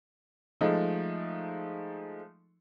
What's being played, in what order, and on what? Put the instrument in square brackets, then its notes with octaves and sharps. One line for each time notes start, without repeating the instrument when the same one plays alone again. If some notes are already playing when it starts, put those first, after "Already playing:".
[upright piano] F3 G#3 A3 D#4